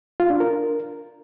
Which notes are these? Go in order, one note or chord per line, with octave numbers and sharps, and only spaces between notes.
F4
D4
A#4